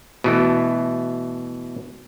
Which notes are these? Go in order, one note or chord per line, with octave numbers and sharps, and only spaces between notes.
B2 E3 A3